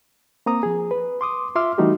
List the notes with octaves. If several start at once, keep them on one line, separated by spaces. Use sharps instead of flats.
A#3 C4 A#5 D#6
F3 G#4
B4
C6 D6 D#6
F4 E5 C6 D6 E6 F6
E3 G3 A3 D#4 F#4 G4